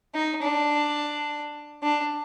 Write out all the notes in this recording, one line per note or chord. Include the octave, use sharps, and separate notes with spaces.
D#4
D4
D4